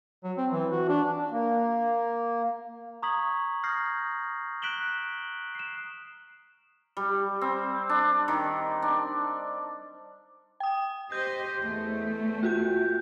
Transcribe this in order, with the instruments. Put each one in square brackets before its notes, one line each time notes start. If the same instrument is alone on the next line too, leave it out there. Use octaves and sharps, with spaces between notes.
[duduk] F#3
C4
E3
F#4
D4
[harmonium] A#3
[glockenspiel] A#5 C#6 D#6 G#6 B6 F#7
D#6 F6 G6 G#6 A#6 C7
F#6 B6 D7 E7 F#7 G7
C7 E7
[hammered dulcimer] G3
C4
D4
D#3
D4
[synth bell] G5 D#6
[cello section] G4 C5 D#5 [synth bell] G6
[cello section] E2 A3
[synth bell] F4 F#4 G6